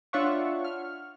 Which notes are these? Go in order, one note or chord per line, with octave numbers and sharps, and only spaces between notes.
D4 F4 C#5 E5 F#5 C#6
F6